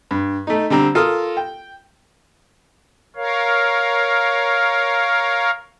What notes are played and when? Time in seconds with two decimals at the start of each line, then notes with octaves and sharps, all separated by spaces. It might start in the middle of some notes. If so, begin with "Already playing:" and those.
0.11 G2
0.47 A3 D#4
0.70 D3 G3 C4 A#5
0.95 F4 A4 A#4 D#6 F6
1.37 G5
3.16 A#4 C#5 F5